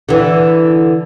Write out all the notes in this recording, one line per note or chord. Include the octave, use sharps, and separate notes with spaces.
D3 E3